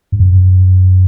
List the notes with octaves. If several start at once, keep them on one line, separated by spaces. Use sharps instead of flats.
G2
F#2